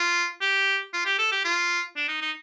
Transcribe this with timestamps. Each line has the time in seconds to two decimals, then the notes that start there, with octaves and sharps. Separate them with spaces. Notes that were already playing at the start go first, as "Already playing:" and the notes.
Already playing: F4
0.41 G4
0.93 F4
1.05 G4
1.19 A4
1.32 G4
1.45 F4
1.96 D4
2.08 D#4
2.22 D#4